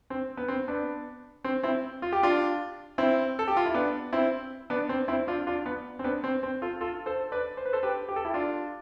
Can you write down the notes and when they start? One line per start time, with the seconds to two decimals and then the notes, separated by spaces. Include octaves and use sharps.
0.10 C4
0.37 B3
0.48 C4
0.68 B3 D4
1.44 C4
1.63 C4 E4
2.02 F4
2.12 G4
2.23 D4 F4
2.98 C4 E4
3.39 A4
3.48 G4
3.57 F4
3.66 E4
3.74 B3 D4
4.13 C4 E4
4.70 B3 D4
4.89 C4
5.08 C4 E4
5.28 D4 F4
5.47 D4 F4
5.66 B3
5.99 C4
6.04 B3 D4
6.24 C4
6.43 C4
6.62 F4 A4
6.81 F4 A4
7.06 A4 C5
7.32 B4 D5
7.57 C5
7.65 B4
7.73 A4 C5
7.83 G4 B4
8.09 G4
8.16 A4
8.25 E4 G4
8.34 D4 F4